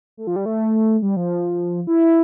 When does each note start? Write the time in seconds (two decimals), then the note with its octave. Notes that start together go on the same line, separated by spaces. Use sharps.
0.17 A3
0.27 F3
0.36 G3
0.46 A3
1.02 G3
1.17 F3
1.87 E4